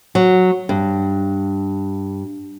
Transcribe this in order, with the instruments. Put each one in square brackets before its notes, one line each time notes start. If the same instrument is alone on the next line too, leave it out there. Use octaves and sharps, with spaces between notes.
[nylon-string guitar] F#3
G2